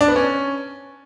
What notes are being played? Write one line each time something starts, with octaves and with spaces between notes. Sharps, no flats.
D4
B3
C#4